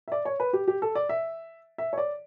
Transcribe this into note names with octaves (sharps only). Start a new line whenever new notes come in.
E5
D5
C#5
B4
G4
G4
A4
D5
E5
E5
C#5
D5